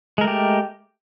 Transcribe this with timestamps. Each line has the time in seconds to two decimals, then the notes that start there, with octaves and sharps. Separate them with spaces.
0.18 G#3
0.21 A#4
0.24 A3
0.27 G4